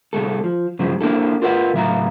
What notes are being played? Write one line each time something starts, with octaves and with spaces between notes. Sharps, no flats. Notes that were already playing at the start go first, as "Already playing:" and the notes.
C2 G2 G#3 A4
F3
G2 C#3 F3 F#3 G#3
A#3 D4 E4 A4
F4 A#4 B4 E5 F#5
C#2 A2 F#3 E5 F5 A#5